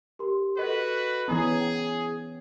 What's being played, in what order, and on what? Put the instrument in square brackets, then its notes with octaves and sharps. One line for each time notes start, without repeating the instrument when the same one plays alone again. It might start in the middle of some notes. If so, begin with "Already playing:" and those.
[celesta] G4 A#4 C6
[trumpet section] F#4 B4 [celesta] A4 D#5
[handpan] E3 B3 C#4 [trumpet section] G#4 [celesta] A#5
[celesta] G5